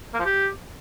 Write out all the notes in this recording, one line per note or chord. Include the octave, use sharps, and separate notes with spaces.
A#3
F3
G4